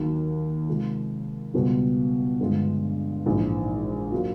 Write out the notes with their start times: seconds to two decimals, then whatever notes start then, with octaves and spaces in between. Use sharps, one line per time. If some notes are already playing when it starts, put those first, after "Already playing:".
Already playing: D#2 D#3 F#3
0.68 C3 F3 G#3
1.54 C#2 B2 G3 B3
2.40 G2 D3 F3 G#3
3.26 A#1 G#2 E3
4.12 A#2 F#3 A#3